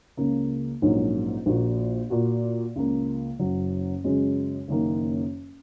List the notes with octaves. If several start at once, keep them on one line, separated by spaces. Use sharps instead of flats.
C#2 C#3 A#3
A#1 G#2 F#3 A#3 C#4
A#1 A#2 A#3 F#4
A#2 A#3 F#4
C#2 C#3 A#3
F#1 F#2 F#3
F#2 C#3 G#3 C#4 F#4
F#1 F#2 D#3 A#3